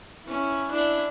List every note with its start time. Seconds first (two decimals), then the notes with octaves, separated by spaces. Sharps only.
0.24 C#4 E4
0.71 D4 E4